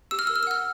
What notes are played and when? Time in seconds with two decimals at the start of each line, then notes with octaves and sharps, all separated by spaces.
0.11 G4 E6
0.19 F6
0.27 A#4 E6
0.36 F6
0.43 E6
0.47 F#5 F6